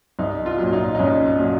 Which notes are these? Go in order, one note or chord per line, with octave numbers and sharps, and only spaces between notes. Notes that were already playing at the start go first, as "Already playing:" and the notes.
C2 D#4
F4
A#2 F#3
D#4
D#4
C2 C#4
A#2 F#3